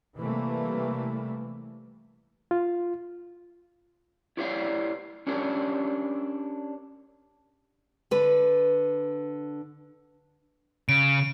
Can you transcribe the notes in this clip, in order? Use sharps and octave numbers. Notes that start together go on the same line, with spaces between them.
C3 E3 G3 A3 A#3
F4
E4 G4 B4 C#5 D5 F5
C#4 D4 G4 A#4 C#5
D3 B4
C#3 D7